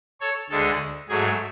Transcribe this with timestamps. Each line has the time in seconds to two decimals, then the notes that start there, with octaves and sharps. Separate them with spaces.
0.21 A4 C#5
0.50 D2 D3 G#3 A4
1.09 G#2 F#3 A3 G#4